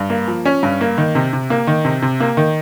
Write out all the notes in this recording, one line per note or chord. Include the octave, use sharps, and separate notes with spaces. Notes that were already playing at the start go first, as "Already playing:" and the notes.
Already playing: G2
A#3
F3
C#4
G2
A#3
D#3
C3
C3
A#3
D#3
C3
C3
A#3
D#3